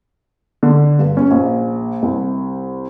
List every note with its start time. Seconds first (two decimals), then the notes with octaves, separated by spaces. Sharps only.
0.63 D3
0.99 G2
1.17 C#4
1.31 A#1
2.02 C2